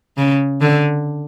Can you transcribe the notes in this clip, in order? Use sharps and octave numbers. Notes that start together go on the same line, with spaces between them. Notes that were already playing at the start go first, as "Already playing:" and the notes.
C#3
D3